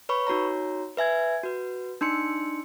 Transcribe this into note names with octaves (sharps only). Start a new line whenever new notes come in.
B4 C#5 B5 C#6
D#4 F#4 C#5 A#5
B4 E5 G#5 G#6
F#4 B4
D4 D#4 C6 C#7